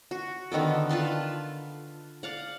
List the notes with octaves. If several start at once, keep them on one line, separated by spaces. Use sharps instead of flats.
F#4
D3 D#3 B3 A4
F4 B4 A5 C6
D5 F5 F#5